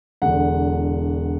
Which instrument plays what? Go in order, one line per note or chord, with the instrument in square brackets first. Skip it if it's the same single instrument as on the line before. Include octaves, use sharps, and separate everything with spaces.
[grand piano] E1 E2 D3 F#5